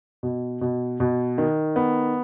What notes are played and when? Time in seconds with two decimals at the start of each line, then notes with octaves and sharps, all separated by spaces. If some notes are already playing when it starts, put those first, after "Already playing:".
0.23 B2
0.61 B2
1.00 B2
1.38 D#3
1.76 B3